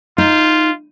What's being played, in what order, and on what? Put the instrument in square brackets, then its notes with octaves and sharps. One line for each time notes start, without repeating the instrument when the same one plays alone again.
[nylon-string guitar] D#4 [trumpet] F4